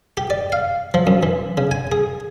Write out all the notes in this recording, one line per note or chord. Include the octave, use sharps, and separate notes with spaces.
G4
D5
F5
F3
F#2
E3
C#3
G#5
G#4